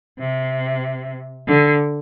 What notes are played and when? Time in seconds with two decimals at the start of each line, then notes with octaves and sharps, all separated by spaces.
0.19 C3
1.48 D3